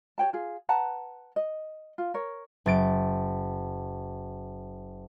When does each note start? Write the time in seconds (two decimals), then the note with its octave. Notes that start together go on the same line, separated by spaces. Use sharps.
0.18 G4 C#5 G5 A5
0.33 F4 G#4
0.69 B4 F#5 A5 A#5
1.36 D#5
1.98 F4
2.14 A#4 C#5
2.66 F#1 A6 D7